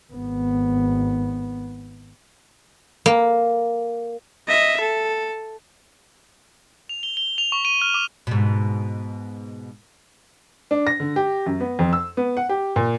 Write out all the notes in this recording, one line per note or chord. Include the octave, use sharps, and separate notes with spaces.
G#1 B3
A#3
D#5 E5
A4
F7
G7
G7
F7
C#6
D#7
F6
D6
G#2 B2
D4
A#6
D3
G4
F#2
B3
F2
E6
B3
F#5
G4
A#2